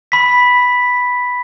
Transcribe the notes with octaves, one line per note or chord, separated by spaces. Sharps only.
B5 B6